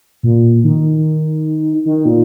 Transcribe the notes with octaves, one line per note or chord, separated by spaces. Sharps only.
A#2
D#3
D#3
A#2